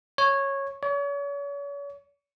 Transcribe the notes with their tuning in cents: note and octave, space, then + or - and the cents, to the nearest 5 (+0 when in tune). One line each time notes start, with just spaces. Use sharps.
C#5 -10
C#5 +40